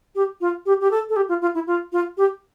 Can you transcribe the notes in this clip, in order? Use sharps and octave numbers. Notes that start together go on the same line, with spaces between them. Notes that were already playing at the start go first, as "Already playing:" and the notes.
G4
F4
G4
G4
A4
A4
G4
F4
F4
E4
F4
F4
G4